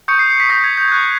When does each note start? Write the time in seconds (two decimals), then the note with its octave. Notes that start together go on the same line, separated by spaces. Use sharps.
0.08 C#6 D#6 G6 C#7
0.19 C7
0.30 C7
0.40 B6
0.49 D#6 G6 A#6
0.64 G#6
0.77 G6
0.92 C#6 F#6 G#6